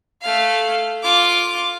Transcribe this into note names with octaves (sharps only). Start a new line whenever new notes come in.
A3 F5
F4 D6